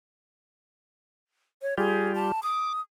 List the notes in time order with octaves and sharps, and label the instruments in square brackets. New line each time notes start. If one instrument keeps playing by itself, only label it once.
[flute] C#5
[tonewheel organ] G3 F4 G4 [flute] G#4
[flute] A5
[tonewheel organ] D6 [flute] D#6